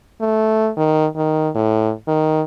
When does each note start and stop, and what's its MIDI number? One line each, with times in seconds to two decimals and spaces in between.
0.21 0.70 57
0.77 1.06 51
1.16 1.49 51
1.55 1.93 45
2.08 2.42 51